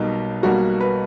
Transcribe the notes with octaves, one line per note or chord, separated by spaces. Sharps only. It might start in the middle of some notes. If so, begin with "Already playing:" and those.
Already playing: B1 B2 G3 A#3 D#4
B1 B2 G3 A#3 F#4
B4